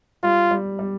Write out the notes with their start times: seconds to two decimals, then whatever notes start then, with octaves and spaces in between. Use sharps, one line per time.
0.23 G3 F4
0.51 G3
0.79 G3